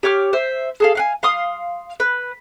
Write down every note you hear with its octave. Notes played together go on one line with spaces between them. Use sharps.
G4 C#5 D6 F6
C5 E5
G#4 A4 F5
F5 F#5 G#5
F5 C6 D#6
B4